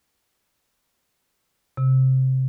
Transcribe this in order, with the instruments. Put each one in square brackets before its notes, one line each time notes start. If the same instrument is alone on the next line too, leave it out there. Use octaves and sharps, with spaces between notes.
[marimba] C3